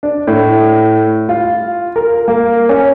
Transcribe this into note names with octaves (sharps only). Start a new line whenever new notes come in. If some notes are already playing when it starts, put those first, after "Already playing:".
D4
A2
F4
A#4
A#3
C#4